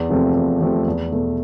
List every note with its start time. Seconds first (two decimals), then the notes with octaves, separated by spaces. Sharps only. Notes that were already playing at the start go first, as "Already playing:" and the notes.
Already playing: E2
0.09 C3 F3 A3 C4
0.34 E2
0.60 C3 F3 A3 C4
0.87 E2
1.12 B2 A3